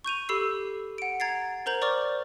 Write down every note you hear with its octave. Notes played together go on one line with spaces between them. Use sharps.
C#6 G6 D#7 F7
G4 A4 B5 E6 C7
F#5 D7
A#5 G#6 A6 C7
A#4 C5 A#5 G6 F#7
C5 D5 C#6 D6 F6 A6